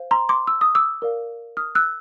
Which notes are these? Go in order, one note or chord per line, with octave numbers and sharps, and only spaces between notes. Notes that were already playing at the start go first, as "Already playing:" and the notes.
Already playing: C5 F5
A#5 C6
C6 D6
E6
D#6
D6 E6
A#4 D5 F5
D#6 F6
E6 F#6